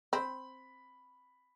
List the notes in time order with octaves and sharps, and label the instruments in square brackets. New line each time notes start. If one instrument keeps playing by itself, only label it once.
[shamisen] C4 [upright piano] B5